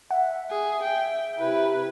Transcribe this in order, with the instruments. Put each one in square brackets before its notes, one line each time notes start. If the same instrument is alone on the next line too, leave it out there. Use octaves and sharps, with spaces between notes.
[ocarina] E5 [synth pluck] F#5
[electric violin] G#4 [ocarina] E5
[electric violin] G5
[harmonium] C3 E4 [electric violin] B4